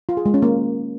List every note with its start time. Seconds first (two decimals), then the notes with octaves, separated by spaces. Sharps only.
0.09 F4
0.17 G#4
0.26 G#3
0.34 C#4
0.42 A#3